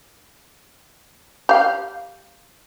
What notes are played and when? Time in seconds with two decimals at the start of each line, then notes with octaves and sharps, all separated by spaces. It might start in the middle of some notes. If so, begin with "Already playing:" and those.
1.49 G4 F5